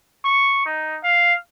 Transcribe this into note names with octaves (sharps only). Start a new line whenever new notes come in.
C#6
D#4
F5